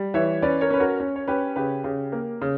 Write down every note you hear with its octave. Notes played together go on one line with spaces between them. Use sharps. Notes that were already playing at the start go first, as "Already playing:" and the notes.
Already playing: G3
E3 C#5 E5
C#4 B4 D5
A#4 C#5
C#4 B4
F#4 A#4
C#4
C#5
C#4 G4 B4
C#3 G4 B4
C#3 G4
A#3
C#3